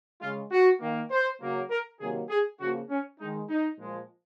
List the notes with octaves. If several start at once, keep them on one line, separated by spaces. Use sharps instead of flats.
C#3 G#3 F4
F#4
D#3 A#3
C5
C#3 F#3 A#3
A#4
C3 D#3 F#3 A#3 G#4
G#4
C#3 F3 A#3 F#4
C#4
D#3 G#3 D#4
D#4
A#2 F3 G#3